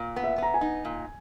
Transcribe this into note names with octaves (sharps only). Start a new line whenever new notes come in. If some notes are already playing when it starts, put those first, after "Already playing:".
Already playing: A#2
B3
E5
B3 A#5
G#5
D#4
A#2